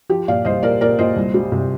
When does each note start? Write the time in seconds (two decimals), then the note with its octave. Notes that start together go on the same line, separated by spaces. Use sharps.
0.09 F3 G4
0.28 A#2 D5 F5
0.45 C2 C5 D#5
0.63 A#2 A#4 D5
0.81 A#2 A#4 D5
0.99 A#2 C5 D#5
1.16 C2
1.34 G3
1.52 C3